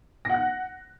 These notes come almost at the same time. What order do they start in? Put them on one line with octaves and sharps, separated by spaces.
A#6 F#5 F#6